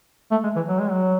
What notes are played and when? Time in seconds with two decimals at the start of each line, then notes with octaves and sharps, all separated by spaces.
0.31 A3
0.44 G#3
0.56 E3
0.68 F#3
0.79 G#3
0.90 F#3